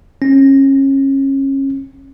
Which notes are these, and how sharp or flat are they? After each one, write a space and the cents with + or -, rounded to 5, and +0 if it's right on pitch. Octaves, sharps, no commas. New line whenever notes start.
C#4 -30